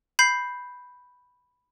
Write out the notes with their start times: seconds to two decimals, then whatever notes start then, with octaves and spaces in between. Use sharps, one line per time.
0.19 B5 G6 C7